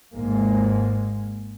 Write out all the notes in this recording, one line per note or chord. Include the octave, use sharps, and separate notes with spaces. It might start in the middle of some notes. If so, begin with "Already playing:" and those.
G#1 G#2 G#3 A#3